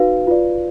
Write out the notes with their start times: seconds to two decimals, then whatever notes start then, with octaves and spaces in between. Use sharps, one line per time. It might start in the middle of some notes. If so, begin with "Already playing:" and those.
Already playing: D#4 F#4 B4 F5
0.27 F4 B4 D5